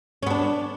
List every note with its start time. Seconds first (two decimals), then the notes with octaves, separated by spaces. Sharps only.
0.23 C#4
0.27 B3
0.30 D4